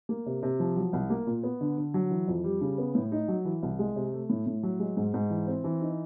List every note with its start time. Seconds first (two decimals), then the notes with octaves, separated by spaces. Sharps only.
0.09 A#3
0.26 C3
0.43 C3
0.60 F3
0.76 F#3
0.93 C2
1.10 A#3
1.27 A#2
1.43 B3
1.61 D3
1.78 D3
1.94 F#3
2.11 E3
2.28 F2
2.44 G3
2.61 C#3
2.78 B3
2.95 A2
3.12 D#4
3.28 F#3
3.45 E3
3.63 C2
3.79 G#3
3.96 C3
4.13 A3
4.29 A2
4.46 A2
4.63 F#3
4.80 G#3
4.97 G#2
5.14 G#2
5.30 E3
5.47 C4
5.64 E3
5.81 D#4